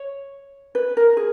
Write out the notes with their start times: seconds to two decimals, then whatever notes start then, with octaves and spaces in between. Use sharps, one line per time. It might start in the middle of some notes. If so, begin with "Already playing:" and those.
Already playing: C#5
0.75 B4
0.97 A#4
1.17 G#4